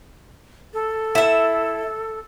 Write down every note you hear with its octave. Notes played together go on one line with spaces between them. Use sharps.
A4
E4 E5